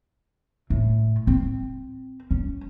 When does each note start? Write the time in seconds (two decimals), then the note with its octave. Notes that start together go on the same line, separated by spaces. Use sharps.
0.70 A2
1.27 C4
2.31 C#4